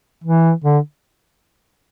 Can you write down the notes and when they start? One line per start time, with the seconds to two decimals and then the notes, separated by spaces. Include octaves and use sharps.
0.24 E3
0.64 D3